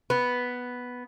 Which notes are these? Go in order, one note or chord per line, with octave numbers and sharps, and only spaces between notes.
B3